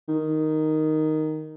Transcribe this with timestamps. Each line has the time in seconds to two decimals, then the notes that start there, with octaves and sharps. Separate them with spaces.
0.08 D#3